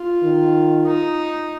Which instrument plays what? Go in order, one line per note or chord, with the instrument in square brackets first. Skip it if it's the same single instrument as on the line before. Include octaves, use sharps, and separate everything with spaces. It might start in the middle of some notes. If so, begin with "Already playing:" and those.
Already playing: [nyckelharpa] F4
[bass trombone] D#3
[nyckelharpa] D#4